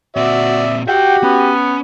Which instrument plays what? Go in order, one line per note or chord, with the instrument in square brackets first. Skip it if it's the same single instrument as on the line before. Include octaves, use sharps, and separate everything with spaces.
[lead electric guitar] A#2 C4 [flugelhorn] F#4 [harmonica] D5 E5
[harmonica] F#4 [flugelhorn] G4 [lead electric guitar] E5 F#5 [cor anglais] G5
[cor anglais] B3 [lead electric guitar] C#4